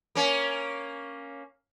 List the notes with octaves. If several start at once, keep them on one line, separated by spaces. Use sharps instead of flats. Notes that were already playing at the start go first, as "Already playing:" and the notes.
A#3 C#4